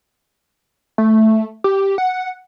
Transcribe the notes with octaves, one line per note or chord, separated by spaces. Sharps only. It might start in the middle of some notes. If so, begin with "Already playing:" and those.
A3
G4
F#5